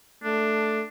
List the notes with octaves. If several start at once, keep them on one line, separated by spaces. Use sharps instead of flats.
A3 D4